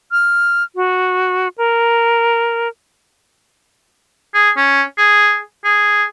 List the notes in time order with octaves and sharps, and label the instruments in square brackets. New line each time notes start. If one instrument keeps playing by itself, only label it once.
[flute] F6
F#4
A#4
[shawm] G#4
C#4
G#4
G#4